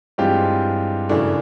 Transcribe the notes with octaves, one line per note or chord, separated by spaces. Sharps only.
G2 E3 G#3 C4 F4 G4
F#2 C#3 E3 A3 D4